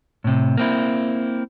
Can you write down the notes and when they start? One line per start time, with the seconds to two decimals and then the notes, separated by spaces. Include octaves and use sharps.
0.24 A2 C3
0.57 A#3 C4 E4